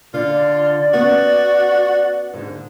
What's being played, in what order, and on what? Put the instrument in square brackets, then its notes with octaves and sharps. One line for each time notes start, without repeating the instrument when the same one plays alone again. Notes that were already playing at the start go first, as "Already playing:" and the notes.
[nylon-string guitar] D3 [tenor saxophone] F4 [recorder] D5
[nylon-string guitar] B3 C#4 [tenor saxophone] F#4
[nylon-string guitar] G#2 D3